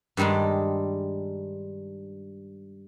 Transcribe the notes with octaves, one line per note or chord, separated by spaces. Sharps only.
G2 D#3 G3 G#3 D4